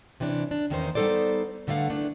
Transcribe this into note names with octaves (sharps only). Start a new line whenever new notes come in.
C3 E3 C#4 D4
D4
E2 D#3 A#3 C#4 D#4 C5
G3 B3 D#4 A4 C5 D5
G2 D3 A3 A#4 F5 F#5
D#3 E3 A3 B3 D4